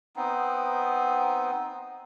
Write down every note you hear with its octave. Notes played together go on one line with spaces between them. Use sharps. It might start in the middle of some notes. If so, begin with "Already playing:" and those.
B3 C4 D#4